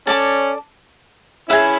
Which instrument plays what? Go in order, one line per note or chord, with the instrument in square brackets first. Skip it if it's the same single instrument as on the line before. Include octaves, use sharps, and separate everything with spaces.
[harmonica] C#4 [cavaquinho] A4 D5 A5 D6
[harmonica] C#4 E4 [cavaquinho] G#4 B4 E5